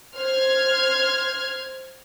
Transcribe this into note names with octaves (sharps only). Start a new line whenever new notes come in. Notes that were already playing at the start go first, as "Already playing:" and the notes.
C5 F6 G#6